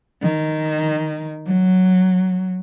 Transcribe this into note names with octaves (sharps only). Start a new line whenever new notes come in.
D#3
F#3